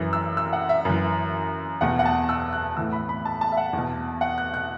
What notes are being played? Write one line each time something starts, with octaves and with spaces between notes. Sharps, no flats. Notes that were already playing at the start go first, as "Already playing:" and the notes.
Already playing: F#2 E3
E6
E6
F#5
E5
F#2 E3
E2 B2 F#5
F#5
A5
E6
F#6
A2 E3 E6
B5
B5
A5
A5
E5
F#5
E2 B2
F#5
F#6
F#6